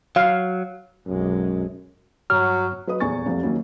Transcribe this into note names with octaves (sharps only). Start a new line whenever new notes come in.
F#3 F5
B1 F#2 C3 G#3
G2 F#3 F6
F#3 B4 D#5 D#6
D#1 E2 G#5 C#6 A6
F1 C2 C3 F3
D#2 D#3 F#3 A#3 C#4